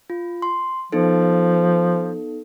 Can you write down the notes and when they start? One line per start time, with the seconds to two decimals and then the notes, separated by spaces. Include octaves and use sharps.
0.10 F4
0.42 C6
0.92 F3 B3 D#4 A4